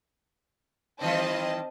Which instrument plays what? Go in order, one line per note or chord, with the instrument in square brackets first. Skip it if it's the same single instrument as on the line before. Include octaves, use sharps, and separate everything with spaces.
[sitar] D#3 E3 G3 [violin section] C4 D#5 A5